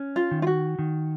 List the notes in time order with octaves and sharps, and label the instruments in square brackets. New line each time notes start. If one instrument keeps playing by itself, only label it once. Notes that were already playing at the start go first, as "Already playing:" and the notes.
Already playing: [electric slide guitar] C#4
[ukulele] F4
[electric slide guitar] D#3
[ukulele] F4
F#4
[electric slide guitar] D#3